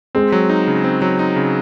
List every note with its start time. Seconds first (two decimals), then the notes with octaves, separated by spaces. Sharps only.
0.15 G#3 C4
0.32 F#3
0.50 D#4
0.67 C#3
0.84 C4
1.02 F#3
1.19 D#4
1.36 C#3